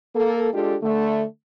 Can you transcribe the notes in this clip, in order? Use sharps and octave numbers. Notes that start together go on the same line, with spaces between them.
A#3 A4
G#3 D4 F4 G4 A4
D3 A3